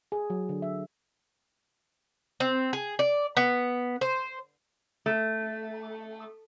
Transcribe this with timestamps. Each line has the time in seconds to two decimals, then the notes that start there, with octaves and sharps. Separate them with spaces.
0.12 G#4
0.30 F#3
0.49 D3
0.62 E5
2.40 C4
2.73 G#4
2.99 D5
3.37 B3
4.01 C5
5.06 A3